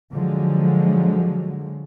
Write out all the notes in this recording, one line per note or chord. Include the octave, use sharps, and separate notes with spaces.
D3 F3 F#3 G#3